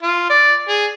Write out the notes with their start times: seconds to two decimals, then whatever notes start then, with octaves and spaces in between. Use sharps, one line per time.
0.03 F4
0.29 D5
0.68 G#4